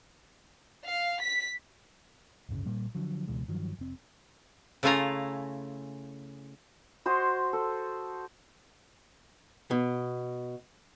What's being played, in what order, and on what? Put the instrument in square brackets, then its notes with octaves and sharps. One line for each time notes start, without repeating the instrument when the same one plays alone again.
[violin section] F5
B6
[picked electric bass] D1 G1 C#3
A#1 A#2 G3 A#3
D3 F3 F#3
C#2 B2 E3 G#3
G2 D#3 F3 F#3
F1 C4
[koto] C#3 A3 E4 F4 G#5 A#5
[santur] F#4 C5 D#5 C6
A4
[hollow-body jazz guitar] B2